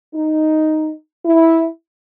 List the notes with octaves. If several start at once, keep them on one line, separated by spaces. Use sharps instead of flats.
D#4
E4